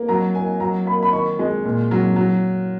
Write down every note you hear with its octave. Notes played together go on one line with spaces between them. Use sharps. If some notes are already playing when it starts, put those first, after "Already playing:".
Already playing: A#3
F#3 A#5
A#3 G#5
F#3 A#5
A#3 B5
B5
D#3 C#6
G#3
A#2
F#3
F#3